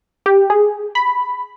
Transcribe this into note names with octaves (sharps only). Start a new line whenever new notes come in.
G4
G#4
B5